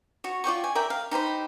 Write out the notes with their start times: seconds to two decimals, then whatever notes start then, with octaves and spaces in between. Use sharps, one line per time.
0.24 F#4 C#5
0.44 F4 D5 G5 C#6
0.64 G#5
0.75 A#4 D5 E5 G5
0.90 F5
1.11 D#4 G4 C5 B5